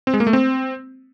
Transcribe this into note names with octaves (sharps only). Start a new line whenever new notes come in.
C4
G#3
A#3
A3
C4